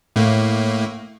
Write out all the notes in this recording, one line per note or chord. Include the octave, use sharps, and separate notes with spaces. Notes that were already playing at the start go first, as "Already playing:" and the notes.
A2 A3 A#3